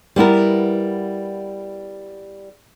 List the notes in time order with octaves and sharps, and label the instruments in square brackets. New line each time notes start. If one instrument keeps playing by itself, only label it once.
[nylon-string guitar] G3 B3 E4 A#4